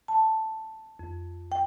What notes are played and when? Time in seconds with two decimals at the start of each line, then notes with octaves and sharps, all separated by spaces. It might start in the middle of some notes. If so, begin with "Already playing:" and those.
0.08 A5
0.99 F2
1.52 G5